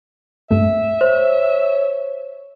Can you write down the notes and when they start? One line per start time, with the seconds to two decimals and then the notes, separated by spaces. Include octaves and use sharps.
0.51 G2 A3 E5
1.01 C5 C#5